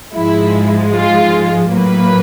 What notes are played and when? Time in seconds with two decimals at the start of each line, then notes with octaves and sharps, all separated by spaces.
0.14 G#2 F3 G#3 E4
0.94 F4
1.72 A2 F#3 A#3 B4